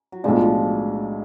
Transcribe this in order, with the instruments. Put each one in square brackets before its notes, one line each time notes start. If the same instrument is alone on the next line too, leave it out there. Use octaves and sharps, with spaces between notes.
[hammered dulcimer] F#3
[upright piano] B1 A2 G#3 D4 [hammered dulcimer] F3
[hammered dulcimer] F3